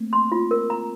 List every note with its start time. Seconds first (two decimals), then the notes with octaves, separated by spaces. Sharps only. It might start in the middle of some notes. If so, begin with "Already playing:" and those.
Already playing: A3 A#3 C4
0.13 C6
0.32 F4
0.51 A#4
0.70 A#5